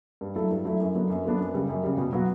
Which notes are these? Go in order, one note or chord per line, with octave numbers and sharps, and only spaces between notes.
G2
F#3 A3 E4 A4
G2
F#3 A3 E4 A4
F#2
D3 F#3 B3 D4
F#2
D3 F#3 B3 D4
F#2
C#3 G3
F#2
C#3 G3
B2
F#3 B3 F#4